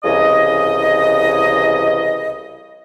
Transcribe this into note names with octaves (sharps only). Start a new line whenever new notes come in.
C2 C#3 E3 D#5